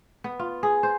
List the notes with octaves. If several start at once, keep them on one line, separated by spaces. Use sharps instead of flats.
B3
F4
G#4
C5